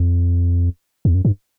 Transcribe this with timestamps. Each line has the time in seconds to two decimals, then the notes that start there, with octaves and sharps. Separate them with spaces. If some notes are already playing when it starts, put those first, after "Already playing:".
Already playing: F2
1.05 E2
1.15 F#2
1.25 G2